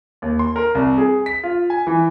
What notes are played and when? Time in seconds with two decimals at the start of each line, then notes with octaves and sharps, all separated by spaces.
0.22 D#2
0.39 C6
0.56 A#4
0.75 C2
0.98 G#4
1.26 B6
1.44 F4
1.70 G#5
1.87 E3